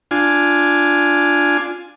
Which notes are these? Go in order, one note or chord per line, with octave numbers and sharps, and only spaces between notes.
D4 F4 G#5